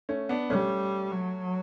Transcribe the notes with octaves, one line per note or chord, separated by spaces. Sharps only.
A3 C#4
B3 D4
G3 A3 C#4
F#3